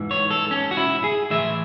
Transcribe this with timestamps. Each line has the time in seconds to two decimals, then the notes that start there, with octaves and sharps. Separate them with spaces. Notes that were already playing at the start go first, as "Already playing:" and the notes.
Already playing: G#2 E3
0.11 C#5
0.31 A4
0.51 C#4
0.71 F#4
0.77 E4
1.04 G#4
1.30 A2 E3 E5